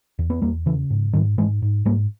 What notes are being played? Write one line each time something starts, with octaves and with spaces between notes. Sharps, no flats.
E2
B3
E2 G3 A#3
C#3 E3
G#2
G#2 D#3 G3
G#2 E3 G#3
G#2
G#2 G3 A#3